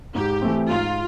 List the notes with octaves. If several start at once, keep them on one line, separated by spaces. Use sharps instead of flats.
G#2 G4
E3 A3 C4
G#2 F4